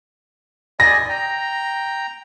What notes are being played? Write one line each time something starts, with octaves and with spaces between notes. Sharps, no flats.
D5 D#5 G#5 A#6
G5 A#5